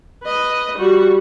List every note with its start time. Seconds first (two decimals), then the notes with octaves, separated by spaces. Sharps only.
0.23 B4 D#5
0.78 G3 F#4